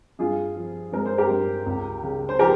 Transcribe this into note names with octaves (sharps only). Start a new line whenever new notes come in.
G2 F4 G#4
F3
G#3 A#4
C5
G4 A#4
G2
C#2
C#3
C5
F3 G4 A#4